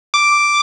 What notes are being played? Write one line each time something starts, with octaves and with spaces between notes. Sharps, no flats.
D6